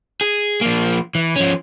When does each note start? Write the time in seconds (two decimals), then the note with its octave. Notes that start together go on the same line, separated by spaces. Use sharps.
0.21 G#4
0.61 F3 A#3
1.15 E3
1.36 F3 C#4